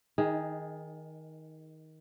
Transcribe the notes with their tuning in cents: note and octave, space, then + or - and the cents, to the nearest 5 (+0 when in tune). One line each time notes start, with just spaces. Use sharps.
D#3 +20 D#4 -10 G#4 +0